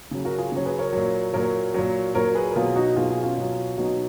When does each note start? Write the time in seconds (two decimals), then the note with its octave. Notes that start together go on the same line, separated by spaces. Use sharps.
0.11 C#3 F#3
0.25 F#4 A#4
0.38 F4 G#4
0.52 C#3 F#3 C#5
0.65 G#4 B4
0.79 A#4 C#5
0.93 A#2 F#3
1.34 A#2 F#3 A#4 C#5
1.74 A#2 F#3
2.15 A#2 F#3 A#4 C#5
2.35 G#4 B4
2.50 A#4
2.56 B2 F#3 F4 G#4
2.76 D#4 F#4
2.96 B2 F#3 F4 G#4
3.10 F4 G#4
3.23 C#4 F4
3.37 B2 F#3
3.77 B2 F#3 D#4 F#4